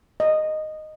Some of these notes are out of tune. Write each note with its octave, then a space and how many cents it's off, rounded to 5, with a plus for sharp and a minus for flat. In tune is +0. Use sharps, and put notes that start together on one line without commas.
D#5 -5